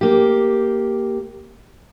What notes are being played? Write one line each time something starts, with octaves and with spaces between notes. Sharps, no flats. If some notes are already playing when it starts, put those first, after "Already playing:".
A#3 G4